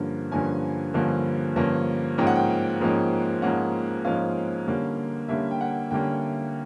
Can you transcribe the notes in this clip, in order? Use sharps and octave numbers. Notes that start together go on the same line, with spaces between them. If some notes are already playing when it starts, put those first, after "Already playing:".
Already playing: G2 D3 F3 A#3 C#4
G2 D3 F3 A#3 C#4 G#5
G2 D3 F3 A#3 C#4
G2 D3 F3 A#3 C#4
G#2 F3 A#3 C#4 G5
F#5
G5
G#2 F3 A#3 C#4
G#2 F3 A#3 C#4 F#5
G#2 F3 A#3 C#4 F5
D3 G3 A#3 C#4
D3 G3 A#3 C#4 E5
G5
F#5
D3 G3 A#3 C#4 G5